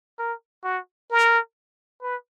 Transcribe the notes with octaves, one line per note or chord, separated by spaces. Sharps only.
A#4
F#4
A#4
B4